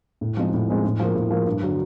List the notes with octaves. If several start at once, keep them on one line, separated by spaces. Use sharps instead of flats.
A2
F3 G#3 C4 D#4
A2
F3 G#3 C4 D#4
A2
F3 A#3
A2
F3 A#3
G2
D3 F#3